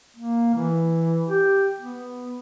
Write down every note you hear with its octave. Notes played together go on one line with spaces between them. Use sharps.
A#3
E3
G4
B3